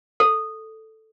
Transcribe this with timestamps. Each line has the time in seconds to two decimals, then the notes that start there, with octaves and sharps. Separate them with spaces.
0.20 A4